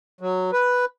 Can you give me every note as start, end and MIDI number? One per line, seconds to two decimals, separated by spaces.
0.21 0.51 54
0.53 0.85 71